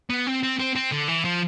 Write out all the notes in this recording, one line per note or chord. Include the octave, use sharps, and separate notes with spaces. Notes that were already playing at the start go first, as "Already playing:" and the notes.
B3
C4
C4
C4
C4
D3
E3
F3